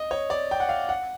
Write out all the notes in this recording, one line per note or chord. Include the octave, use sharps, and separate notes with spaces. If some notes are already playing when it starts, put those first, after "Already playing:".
Already playing: D#5
C#5
D5
G5
F#5
F5
F#5